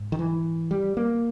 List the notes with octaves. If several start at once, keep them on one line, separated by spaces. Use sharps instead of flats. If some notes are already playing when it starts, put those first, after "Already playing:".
Already playing: G#2
D#3
E3
G3
A#3